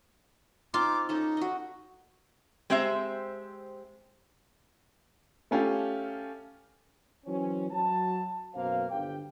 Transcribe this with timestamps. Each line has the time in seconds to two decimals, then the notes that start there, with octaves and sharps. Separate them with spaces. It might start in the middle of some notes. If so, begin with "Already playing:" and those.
0.74 C4 D#4 F4 C5 D6
1.09 C#4 D#4 A4 D#5
1.37 F#4 D#5
2.70 G#3 C4 G4 C5 E5 A#5
5.51 A3 C#4 F4 G4
7.26 E3 F#3 C4 C#4
7.71 F#3 A5
8.54 F#2 B2 A#3 C5 F5
8.91 G1 D3 G4 G5